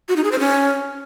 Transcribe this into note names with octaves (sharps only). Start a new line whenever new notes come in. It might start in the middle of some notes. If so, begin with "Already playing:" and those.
F#4
D#4
G#4
C5
C#4